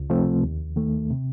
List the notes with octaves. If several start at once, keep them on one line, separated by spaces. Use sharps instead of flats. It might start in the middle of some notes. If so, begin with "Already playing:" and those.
Already playing: C#2
C3 F3 A3 C4
D#2
D#3 A3
C3